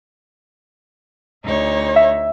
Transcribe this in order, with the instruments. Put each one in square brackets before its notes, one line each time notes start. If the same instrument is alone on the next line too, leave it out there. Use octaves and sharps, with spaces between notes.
[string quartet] D2 D#4 C#5
[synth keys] E5